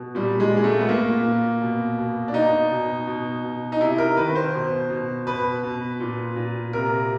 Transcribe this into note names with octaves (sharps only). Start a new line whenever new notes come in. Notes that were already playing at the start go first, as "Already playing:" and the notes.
Already playing: B2
A#2 G3
G#3
A#2 G#3
A3
B3
A#2 A#3
A#2
B2
B2
D4
B2 D#4
B2
B2
B2
D#4
C3 E4
A#4
D#3 B4
C5
B2
B2
B2 B4
B2
A#2
A#2
C3 A#4